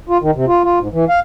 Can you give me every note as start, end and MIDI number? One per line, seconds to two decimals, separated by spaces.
0.09 0.17 65
0.22 0.31 51
0.35 0.45 48
0.48 0.64 65
0.64 0.79 65
0.80 0.88 44
0.93 1.05 52
1.09 1.20 77